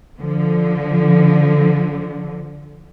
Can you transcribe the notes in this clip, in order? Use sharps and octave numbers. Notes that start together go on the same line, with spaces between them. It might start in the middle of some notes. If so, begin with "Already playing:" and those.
D3 F3